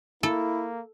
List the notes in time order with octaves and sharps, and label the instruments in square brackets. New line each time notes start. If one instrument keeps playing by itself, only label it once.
[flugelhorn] A#3 [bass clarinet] E4 [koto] A4